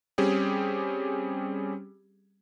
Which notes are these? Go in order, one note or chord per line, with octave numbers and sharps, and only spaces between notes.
G3 C4 C#4 G4 G#4